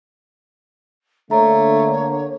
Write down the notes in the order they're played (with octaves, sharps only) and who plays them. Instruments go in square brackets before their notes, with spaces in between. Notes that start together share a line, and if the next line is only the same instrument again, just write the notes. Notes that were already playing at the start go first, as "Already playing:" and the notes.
[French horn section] D3 A#3 [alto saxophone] A3 [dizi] C#5 [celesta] A#5